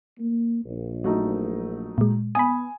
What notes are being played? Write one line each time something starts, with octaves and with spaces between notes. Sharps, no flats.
A#3
A#1
F#3 A3 D#4
A#2 G#3
B3 G#5 B5 D#6